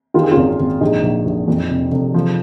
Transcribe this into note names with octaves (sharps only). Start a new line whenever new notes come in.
D#3 F4
G#4
C#4 F4
G#1
G#1
A#1 D#4 G#4
A#1
A#1
F2
F1
F1
F3